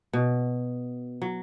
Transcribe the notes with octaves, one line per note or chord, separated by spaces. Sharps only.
B2
F#3